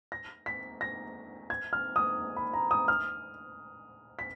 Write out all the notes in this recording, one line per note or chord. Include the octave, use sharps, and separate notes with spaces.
A#6
B6
A#6
G#6
F6
D#6
B5
A#5
D#6
F6
B6